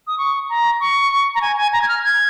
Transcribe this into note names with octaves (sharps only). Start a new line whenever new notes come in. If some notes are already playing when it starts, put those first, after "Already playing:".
D#6
C#6
A#5
C#6
A#5
G#5
G#5
A#5
G#6
F6
G#6